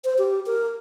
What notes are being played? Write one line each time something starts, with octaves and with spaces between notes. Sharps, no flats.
C5
G4
A#4